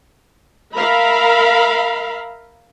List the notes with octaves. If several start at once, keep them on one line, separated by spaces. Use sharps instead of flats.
A#4 E5 F5 A#5 B5